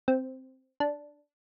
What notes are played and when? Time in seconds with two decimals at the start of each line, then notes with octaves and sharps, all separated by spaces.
0.08 C4
0.80 D4